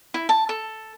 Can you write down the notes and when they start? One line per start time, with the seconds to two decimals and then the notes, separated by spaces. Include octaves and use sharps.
0.14 E4
0.29 A5
0.49 A4